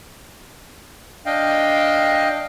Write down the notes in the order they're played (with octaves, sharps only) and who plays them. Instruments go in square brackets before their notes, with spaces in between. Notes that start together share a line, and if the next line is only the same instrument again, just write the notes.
[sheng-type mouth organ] D4 D#5 F5 G5